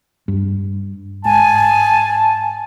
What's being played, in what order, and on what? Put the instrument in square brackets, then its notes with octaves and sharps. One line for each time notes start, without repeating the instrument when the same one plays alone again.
[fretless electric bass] G2
[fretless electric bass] G#2 [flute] G#5 [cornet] A5